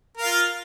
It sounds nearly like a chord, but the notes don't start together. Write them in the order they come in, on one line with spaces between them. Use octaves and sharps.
A#4 F5 F4